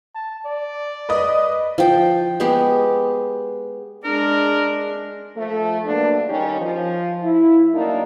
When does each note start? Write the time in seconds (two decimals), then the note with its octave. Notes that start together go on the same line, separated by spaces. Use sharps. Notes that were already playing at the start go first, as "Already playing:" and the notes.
0.15 A5
0.46 D5
1.09 B4 D#5 D#6
1.78 F3 G5
2.40 G#3 B3 G4
4.04 G#3 D4 A#4
5.36 F3 A3
5.85 F#2 A#3 B3 D4
6.28 D#3 G3 C#4 D#4 G4
6.60 F3
7.23 E4
7.74 F#2 A3 A#3 D4 D#4